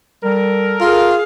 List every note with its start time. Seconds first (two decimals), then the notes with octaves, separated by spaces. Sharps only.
0.24 G3 A4 A#4
0.80 F4 G#4 F5